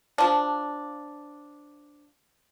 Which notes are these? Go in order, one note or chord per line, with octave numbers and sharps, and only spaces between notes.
F3 D4